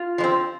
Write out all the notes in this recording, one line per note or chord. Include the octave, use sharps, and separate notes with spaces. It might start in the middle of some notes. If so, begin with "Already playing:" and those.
Already playing: F4
F3 G#3
C4